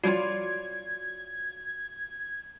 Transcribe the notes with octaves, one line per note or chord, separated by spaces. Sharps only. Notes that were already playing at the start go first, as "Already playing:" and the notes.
F3 G3 F4 F#4 C#5 D5 G#6